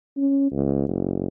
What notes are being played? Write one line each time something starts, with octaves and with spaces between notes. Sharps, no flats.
C#4
C#2
F#1